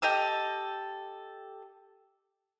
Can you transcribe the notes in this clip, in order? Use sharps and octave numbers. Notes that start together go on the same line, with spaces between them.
G4 A4 D#5 E6